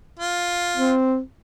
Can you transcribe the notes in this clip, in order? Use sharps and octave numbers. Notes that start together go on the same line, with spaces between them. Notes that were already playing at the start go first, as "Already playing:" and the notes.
F4
C4